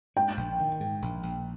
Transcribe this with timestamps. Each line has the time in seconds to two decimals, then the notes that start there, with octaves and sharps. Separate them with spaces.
0.16 G#3 G5
0.37 A#1
0.59 D#3
0.80 G#2
1.02 A#1
1.23 A#1